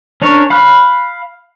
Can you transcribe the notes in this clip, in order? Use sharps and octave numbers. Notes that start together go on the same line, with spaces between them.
C#4 D4 A#4 C#5
F5 B5 F6 F#6